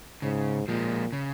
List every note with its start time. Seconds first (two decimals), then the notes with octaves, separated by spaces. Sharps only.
0.22 G#2 C#3
0.68 A#2 F3 G#3
1.12 C#3